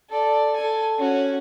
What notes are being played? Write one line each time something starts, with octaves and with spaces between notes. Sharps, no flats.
A4 D5
A4 G#5
C#4 F#4